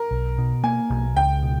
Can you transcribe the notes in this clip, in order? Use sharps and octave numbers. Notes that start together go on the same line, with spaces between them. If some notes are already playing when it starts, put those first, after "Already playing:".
Already playing: A#4
B1
B2
A#3 G#5
B1
C#2 G5
B2